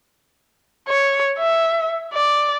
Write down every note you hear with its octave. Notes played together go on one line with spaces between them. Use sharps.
C#5
E5
D5